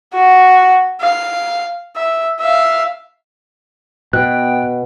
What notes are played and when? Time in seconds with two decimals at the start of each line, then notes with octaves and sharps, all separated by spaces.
0.14 F#4
1.01 F5
1.96 E5
2.40 E5 F5
4.13 B2 B3 G5 F#6